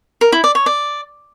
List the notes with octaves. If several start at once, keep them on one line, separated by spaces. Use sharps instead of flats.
A#4
E4
D5
C#5
D5